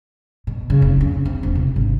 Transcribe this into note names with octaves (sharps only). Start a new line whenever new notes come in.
B2
C#3
F1
C#4
C4
E1
C3
G#1